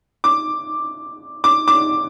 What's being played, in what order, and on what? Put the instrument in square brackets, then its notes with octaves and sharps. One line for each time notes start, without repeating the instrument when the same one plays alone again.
[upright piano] D6
D6
D6